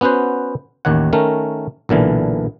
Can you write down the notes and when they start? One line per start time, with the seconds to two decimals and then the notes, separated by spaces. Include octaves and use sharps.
0.01 B3 C#4 F#4 B4 C5
0.85 A1 D#2 D#3 C#5 F#5
1.13 D#3 A3 C#4 A#4
1.89 B1 A#2 D3 E3